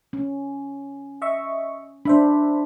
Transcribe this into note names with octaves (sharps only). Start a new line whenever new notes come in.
C#4
D#5 E5 C#6
D4 C5 E5 B5